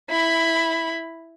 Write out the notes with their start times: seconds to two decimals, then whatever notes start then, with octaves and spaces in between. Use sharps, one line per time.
0.10 E4 B5